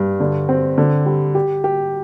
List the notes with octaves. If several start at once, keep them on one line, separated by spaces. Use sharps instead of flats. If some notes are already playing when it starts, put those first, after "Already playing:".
Already playing: G2
D3
C4
D3
G3
G4
G4